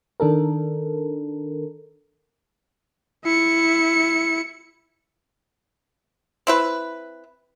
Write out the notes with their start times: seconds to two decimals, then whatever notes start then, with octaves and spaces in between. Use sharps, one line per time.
0.20 D#3 D4 A4 A#4
3.25 E4 C#7
6.47 C4 E4 B4